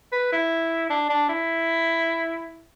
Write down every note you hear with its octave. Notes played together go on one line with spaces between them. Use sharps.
B4
E4
D4
D4
E4